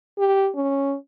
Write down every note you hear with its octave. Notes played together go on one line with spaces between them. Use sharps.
G4
C#4